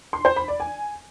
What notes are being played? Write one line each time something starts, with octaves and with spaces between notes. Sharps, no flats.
C6
C5
B5
D5
G#5